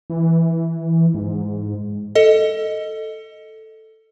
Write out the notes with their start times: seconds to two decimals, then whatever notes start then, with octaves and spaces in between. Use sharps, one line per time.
0.10 E3
1.14 G#2
2.15 A4 D#5